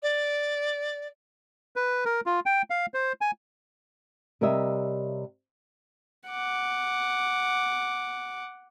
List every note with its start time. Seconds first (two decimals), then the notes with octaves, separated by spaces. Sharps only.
0.02 D5
1.76 B4
2.05 A#4
2.26 F4
2.46 G5
2.70 F5
2.94 C5
3.21 G#5
4.41 C3 G3 A#4 C#5 D#5 E5
6.29 F#5 D6